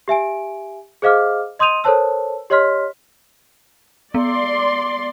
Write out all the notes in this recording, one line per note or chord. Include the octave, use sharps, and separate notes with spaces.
G4 E5 G#5 D7
G#4 C5 D#5 F5 D6 F6
D#5 C6 D#6 G6 D#7 F7
A4 A#4 C5 C#5 A5 E6
G4 C#5 D#5 C6 F6 B6
B3 D5 C6